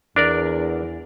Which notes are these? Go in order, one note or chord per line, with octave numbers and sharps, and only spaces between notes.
E2 D4 A#4 D5